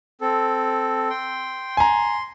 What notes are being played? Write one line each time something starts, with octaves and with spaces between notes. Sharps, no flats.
C4 A4
G5 C6
G#5 A#5 C6